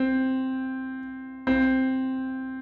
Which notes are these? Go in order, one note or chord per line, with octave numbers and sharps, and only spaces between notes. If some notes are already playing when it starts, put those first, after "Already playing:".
Already playing: C4
C4